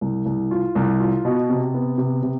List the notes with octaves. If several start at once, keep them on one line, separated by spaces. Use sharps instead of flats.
C2
C2
F4
C2
F4
B2
C3
B3
C3
C3